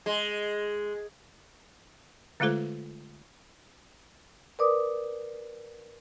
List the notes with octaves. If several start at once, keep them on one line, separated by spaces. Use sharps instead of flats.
G#3
D3 G#3 A3 F4 A4 C5
A#4 B4 D5 D6 D#6